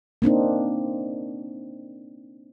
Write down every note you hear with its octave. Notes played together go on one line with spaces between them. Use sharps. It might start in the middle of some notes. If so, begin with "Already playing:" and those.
A#3 C4 D4 D#4